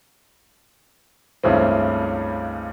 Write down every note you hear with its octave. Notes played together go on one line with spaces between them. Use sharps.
C#2 G2 C#3 E3 A3 C4